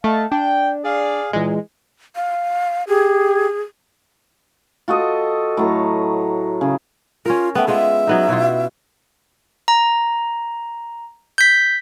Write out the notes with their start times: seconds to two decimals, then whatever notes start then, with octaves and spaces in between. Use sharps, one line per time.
0.04 A3 D#5 F5 A5
0.32 D4 G5
0.84 G#4 D5 F5
1.33 A#2 E3 G#3
2.16 F5
2.87 G4 G#4
4.88 F4 F#4 A4 D#5
5.57 A2 F#3 A#5
6.61 C#3
7.26 C#4 F4 A#4
7.55 A3 B3 G5
7.68 G#3 B3 F4 E5
8.07 F#3 B3 D#4
8.28 B2 E4 F4
9.68 A#5
11.38 G6 B6